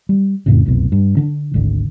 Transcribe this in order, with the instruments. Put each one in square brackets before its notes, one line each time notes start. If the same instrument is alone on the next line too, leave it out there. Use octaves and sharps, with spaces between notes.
[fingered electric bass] G3
F2 A2 C#3
F1 C2 F#2 B2
G2
D3 D4
G#1 D2 D3